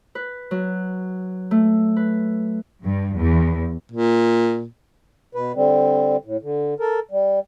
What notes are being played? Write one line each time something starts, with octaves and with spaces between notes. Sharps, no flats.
B4
F#3
A3
B4
G2
E2
A#2
B2 B4
D3 G3 C4
A2
D3
A4 A#4
G3